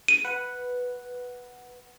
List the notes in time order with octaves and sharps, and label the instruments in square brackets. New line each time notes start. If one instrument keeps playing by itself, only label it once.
[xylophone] D#7
[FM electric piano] B4 F#5